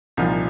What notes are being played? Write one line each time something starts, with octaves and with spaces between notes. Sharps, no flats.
C2 A#2 F3 D#4